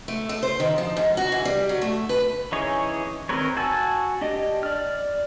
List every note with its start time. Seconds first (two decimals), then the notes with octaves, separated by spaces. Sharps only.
0.08 A3
0.29 A3
0.43 C5
0.60 D#3
0.78 F3
0.97 G#2
1.17 F#4
1.32 E3
1.45 G3
1.69 F#3
1.82 A3
2.09 B4
2.52 E3 C#4 D#4 G#4 C#5
3.29 D#3 C4 A#4 B4 C#5
3.57 F#4 G#5 A5 E6
4.21 D4 G4 D#5
4.63 D5 F6